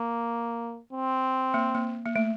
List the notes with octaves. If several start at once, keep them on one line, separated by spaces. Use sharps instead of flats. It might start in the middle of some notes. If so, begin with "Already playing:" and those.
Already playing: A#3
C4
A#3
A#3
A#3
A3